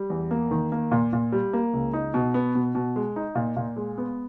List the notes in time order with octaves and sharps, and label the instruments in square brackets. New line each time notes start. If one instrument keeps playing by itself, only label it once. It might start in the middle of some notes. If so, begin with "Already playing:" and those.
Already playing: [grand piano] G3
E2
A#3
D#3
A#3
A#2
A#2
G3
A#3
C#2
D#4
B2
B3
B2
B2
G#3
D#4
A#2
A#2
G#3
B3